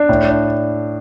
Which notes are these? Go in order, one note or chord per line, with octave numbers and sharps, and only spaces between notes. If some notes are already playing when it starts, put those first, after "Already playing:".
Already playing: D4
A2
D4